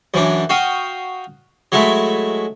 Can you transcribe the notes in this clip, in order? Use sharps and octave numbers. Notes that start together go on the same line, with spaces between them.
F#2 E3 D4
F#4 F5 G5 D#6
F#3 G#3 A3 E4